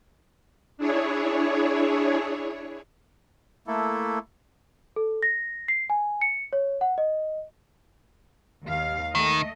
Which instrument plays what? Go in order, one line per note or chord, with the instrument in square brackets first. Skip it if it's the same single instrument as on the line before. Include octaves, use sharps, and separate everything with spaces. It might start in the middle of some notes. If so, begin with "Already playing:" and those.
[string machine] D4 E4 G#4 C#5
[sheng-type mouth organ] A3 A#3 E4 A4
[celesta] A4
A#6
C7
G#5
C#7
C#5
F#5
D#5
[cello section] D#2 F5
[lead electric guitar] D#3 [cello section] A3 D#5